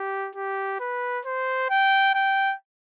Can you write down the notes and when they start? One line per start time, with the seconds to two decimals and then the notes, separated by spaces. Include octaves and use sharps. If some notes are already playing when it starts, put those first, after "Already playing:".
Already playing: G4
0.35 G4
0.80 B4
1.25 C5
1.70 G5
2.14 G5